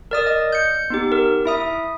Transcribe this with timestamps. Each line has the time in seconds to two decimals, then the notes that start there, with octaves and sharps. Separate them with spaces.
0.11 A#4 D5 D#6
0.27 D#5
0.52 G6 C#7
0.90 B3 D#4 G4
1.12 A#4
1.45 E4 E5 D#6